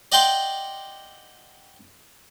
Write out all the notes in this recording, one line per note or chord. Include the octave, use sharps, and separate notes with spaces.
D5 D#5 F#5 G5 C6 D6